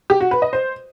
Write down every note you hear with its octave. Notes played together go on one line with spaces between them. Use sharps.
G4
F#4
B4
D#5
C5